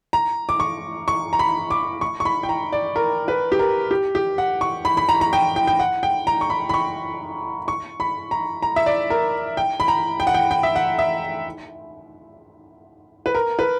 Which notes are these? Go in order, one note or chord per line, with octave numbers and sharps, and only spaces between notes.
A#5
D6
C#6
C#6
A#5
B5
D6
C#6
C#6
B5
G5
A#5
D5
A#4
B4
G4
A#4
G4
G4
F#5
C#6
B5
B5
A#5
A#5
G5
G5
G5
F#5
G5
A#5
C#6
B5
B5
C#6
C#6
B5
A#5
A#5
E5
D5
A#4
G5
B5
A#5
G5
F#5
G5
G5
E5
F#5
E5
B4
A#4
B4